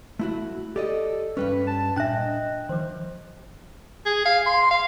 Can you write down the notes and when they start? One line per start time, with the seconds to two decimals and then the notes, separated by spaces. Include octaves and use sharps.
0.19 A3 E4 F#4
0.76 G4 A4 D5 D#5
1.37 G2 G3 C#4 B4
1.67 A5
1.96 A#2 D4 E5 G5 F#6
2.17 D#5
2.69 D#3 F3 C5
4.06 G#4
4.25 F5
4.46 C6
4.71 F5